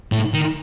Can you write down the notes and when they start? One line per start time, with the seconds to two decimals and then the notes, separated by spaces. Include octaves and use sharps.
0.12 A2
0.34 D#3